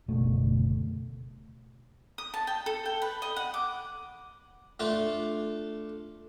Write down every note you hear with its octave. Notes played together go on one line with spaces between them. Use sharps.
F#1 D2 B2 A3
D#6
A5
G5
A4
G5
B4
D#5
F#5
D6
A3 D4 F4